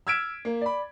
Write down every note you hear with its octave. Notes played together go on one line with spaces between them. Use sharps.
E6 F6 G#6 B6 D7 E7
A#3
D5 B5